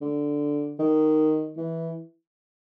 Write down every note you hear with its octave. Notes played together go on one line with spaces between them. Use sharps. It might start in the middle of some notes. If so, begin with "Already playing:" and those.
D3
D#3
E3